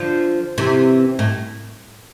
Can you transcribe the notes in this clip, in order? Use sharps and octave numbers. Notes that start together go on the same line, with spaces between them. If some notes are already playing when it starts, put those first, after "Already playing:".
Already playing: D3 F3
C3 E3
A2